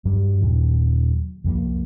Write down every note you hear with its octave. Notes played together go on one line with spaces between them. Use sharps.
G2 F#3 G3
D#2 A#2 F#3
C2 F2 E3 A#3